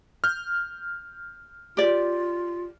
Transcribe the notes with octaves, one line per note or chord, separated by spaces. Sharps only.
F6 G6
F4 G4 D5